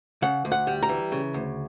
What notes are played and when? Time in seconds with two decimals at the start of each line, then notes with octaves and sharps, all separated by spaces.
0.22 C#3 F#5
0.45 D2
0.52 F#5
0.67 G3
0.83 A#5
0.89 E3
1.12 C#3
1.34 D2